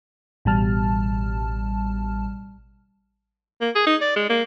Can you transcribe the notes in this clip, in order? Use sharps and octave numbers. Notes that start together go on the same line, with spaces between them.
A1 B2 G3 A5 F6
A#3
G#4
D#4
D5
G#3
A#3